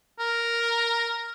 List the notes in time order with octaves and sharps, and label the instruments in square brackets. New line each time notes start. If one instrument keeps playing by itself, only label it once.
[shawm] A#4